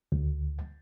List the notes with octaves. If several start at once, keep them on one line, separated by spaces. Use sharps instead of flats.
D2